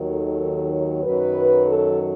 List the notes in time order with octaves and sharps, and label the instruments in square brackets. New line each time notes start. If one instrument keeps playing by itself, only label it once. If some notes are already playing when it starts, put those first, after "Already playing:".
Already playing: [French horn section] D#2 D#3 F#3
A4
C#5
F#2 D#3 F#3 B4
A4